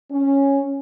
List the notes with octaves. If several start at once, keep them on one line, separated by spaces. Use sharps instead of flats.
C#4